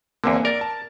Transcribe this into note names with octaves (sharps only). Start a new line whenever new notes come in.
E2 D3 A#3 C4 G#5
A#4 D5 A6
A5